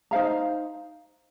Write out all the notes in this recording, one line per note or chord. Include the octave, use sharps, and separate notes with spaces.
D#4 C5 F5 A#5